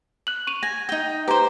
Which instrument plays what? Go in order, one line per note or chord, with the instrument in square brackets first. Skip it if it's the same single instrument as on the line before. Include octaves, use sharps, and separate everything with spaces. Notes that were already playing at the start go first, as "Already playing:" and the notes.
[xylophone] F#6 F#7
C#6 D#7 F7
[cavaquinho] G#5 [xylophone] A#6
[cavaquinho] D#4 G5
[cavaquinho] G4 C5 [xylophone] B4 A#5